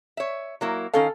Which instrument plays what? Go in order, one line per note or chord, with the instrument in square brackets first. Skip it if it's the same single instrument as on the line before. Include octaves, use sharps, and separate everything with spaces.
[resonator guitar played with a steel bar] C#5 E5
F#3 A#3 E4
[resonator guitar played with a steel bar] D#3 C#4 F5 [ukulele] A4